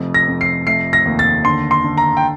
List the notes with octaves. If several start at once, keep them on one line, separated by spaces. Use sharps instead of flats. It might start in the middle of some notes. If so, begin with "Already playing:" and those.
Already playing: F1 F2
A#6
F2
C7
A3 C7
A#6
D#2
A6
D3 C6
C6
D3
A#5
G5